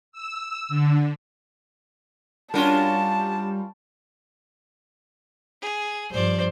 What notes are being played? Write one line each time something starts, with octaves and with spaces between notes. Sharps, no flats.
E6
D3
G3 C#4 D4 F4 F#4 A#4 A5
G#4
G2 F3 C5 D5